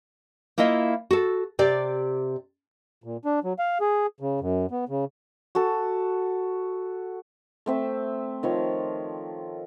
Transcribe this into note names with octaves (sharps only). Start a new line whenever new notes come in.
A#3 E4 F4 D#5 E5
F#4 A4
C3 G4 D5
A#2
D4
F#3
F5
G#4
C#3
F#2
B3
C#3
F#4 A4
A3 C4 E5
D#3 F3 C#5